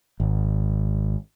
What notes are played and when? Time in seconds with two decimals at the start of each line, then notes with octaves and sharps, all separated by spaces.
0.20 G#1